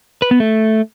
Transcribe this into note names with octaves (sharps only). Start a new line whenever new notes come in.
B4
B3
A3